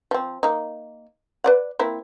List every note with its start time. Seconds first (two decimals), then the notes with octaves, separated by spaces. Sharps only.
0.11 F3 C4
0.43 A#3 D#4
1.44 B4 D5 F#5
1.79 A#3 C4 E4